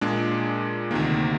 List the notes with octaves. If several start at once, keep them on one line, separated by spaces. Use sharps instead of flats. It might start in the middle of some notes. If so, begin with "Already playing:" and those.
A#2 G#3 D4 G#4
D2 C3 D#3 A#3